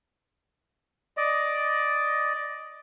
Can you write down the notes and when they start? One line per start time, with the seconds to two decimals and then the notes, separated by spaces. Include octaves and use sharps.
1.17 D5 D#5